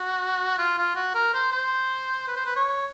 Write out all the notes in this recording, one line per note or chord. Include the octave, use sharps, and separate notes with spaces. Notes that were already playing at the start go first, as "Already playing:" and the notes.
Already playing: F#4
F4
F4
F#4
A#4
C5
C5
B4
C5
B4
C#5